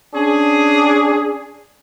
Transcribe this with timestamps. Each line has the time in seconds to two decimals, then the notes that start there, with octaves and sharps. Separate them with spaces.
0.14 C#4 D4 G#4